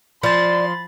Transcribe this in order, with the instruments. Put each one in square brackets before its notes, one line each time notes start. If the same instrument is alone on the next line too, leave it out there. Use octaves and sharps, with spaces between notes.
[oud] F3 [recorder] D5 [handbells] B5 A6 [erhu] C6